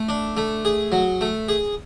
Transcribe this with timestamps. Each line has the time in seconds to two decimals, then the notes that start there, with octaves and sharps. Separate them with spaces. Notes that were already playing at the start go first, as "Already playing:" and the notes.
Already playing: A3
0.09 D4
0.37 A3
0.65 G#4
0.92 F#3
1.21 A3
1.49 G#4